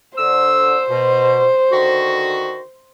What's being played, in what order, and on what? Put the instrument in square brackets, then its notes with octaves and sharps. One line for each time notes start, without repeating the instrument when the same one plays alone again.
[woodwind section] D3 E6 [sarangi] C5
[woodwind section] B2
D3 D#3 F#4